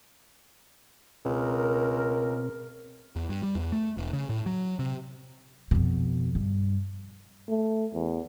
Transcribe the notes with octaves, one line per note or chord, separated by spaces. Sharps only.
C#2 B2 C4 A#4
E2
G2
G3
E2
A3
E1
C#3
A2
F#3
C3
F2 B2
G2
A3
E2